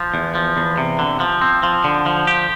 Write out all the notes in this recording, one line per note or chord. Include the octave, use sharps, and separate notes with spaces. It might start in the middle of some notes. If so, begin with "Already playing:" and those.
Already playing: F3
E2
F3
E2
C3
D3
F3
C4
F3
D3
F3
G4